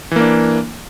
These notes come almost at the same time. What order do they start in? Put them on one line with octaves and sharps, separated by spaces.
E3 A#3 D4